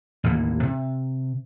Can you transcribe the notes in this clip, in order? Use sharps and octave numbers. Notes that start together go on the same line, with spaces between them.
A1 D#2 A2 A#3
C3